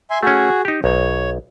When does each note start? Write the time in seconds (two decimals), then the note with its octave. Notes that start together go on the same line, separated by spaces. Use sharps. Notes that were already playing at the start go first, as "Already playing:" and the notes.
0.10 E5 G#5 C6
0.23 A3 C#4 F#4 G#4
0.65 D#4 G4
0.84 B1 C#5